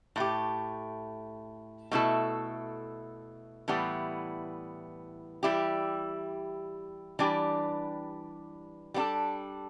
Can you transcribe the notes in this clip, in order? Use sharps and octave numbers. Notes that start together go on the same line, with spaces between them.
A2 A3 G4
B2 A3 E4 A4
A2 E3 G3 B3
E3 G3 E4 G4
E3 G3 D4 G4
G3 B3 D4 A4